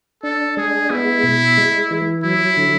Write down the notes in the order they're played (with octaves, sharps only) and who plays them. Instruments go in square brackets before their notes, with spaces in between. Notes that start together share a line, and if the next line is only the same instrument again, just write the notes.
[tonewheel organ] D4 [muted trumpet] A4
[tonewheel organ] G#3 [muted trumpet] G#4
[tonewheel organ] B3 [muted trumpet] E4
[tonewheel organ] B2
G#3
E3
[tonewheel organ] F#3 [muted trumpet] E4
[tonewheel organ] D3